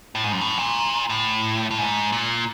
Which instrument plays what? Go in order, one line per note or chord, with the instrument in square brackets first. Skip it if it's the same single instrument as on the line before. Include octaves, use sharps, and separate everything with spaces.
[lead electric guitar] A2
G#2
F#2
A2
A#2
A2
A2
G#2
A#2